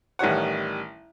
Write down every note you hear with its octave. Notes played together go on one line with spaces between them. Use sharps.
A1 D#3 G3 C#5 F#5